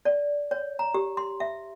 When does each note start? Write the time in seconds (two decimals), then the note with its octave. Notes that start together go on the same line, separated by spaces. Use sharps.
0.05 D5
0.51 C#5
0.79 A#5
0.94 G4
1.17 C6
1.40 E5